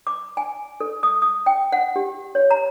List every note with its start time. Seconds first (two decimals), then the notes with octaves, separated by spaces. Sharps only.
0.07 D6
0.37 G#5
0.81 A4
1.03 D#6
1.22 D#6
1.46 G5
1.72 F#5
1.96 G4
2.35 C#5
2.51 A#5